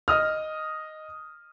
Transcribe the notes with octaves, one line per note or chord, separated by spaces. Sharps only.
D#5 D#6 F6